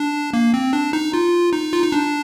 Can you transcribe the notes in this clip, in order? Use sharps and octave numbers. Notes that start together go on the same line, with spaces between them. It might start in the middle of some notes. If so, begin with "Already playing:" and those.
Already playing: D4
A#3
C4
D4
D#4
F4
D#4
F4
D#4
D4